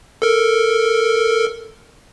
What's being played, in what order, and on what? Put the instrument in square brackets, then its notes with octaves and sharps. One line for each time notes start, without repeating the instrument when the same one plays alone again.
[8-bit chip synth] A4 A#4